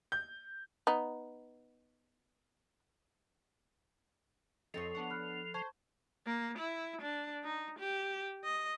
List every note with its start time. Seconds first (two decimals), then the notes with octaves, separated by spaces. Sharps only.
0.12 G6
0.87 B3 D#4
4.74 F2 F3 C4 A4 C#5 D#5
4.95 B3 D4 F#5 A5 C#6
5.10 B5 F6 F#6
5.54 C5 A5 C#6 G#6
6.26 A#3
6.59 E4
7.02 D4
7.44 D#4
7.79 G4
8.44 D#5